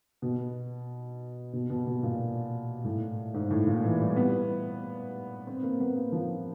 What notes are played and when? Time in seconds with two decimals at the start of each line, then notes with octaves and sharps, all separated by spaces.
0.22 B2
1.53 B2
1.70 B2
1.87 B2
2.03 A#2
2.84 A2
3.34 G#2
3.50 A2
3.67 A#2
3.84 E3
4.00 G3
4.16 B3
5.47 C4
5.63 A#3
5.80 B3
5.96 A#3
6.12 F3